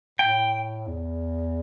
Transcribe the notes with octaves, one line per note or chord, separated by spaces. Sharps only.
A2 G5
E2